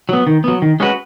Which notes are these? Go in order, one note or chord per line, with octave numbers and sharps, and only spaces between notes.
F#3 B3
D#3
F#3 B3
D#3
G#3 C#4 F#4 B4